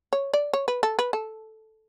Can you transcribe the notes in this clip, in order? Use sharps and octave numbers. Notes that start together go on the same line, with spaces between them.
C#5
D5
C#5
B4
A4
B4
A4